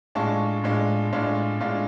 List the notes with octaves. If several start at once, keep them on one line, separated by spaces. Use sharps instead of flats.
A2 G#3 D4 F4 A5 C#6
A2 G#3 D4 F4
A2 G#3 D4 F4
A2 G#3 D4 F4